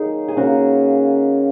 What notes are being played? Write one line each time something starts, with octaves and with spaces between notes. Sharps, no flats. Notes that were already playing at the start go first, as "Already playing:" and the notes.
Already playing: D#3 F#3 A#3 D#4 G#4 C#5
G#4
C#3 A#3 C#4 F#4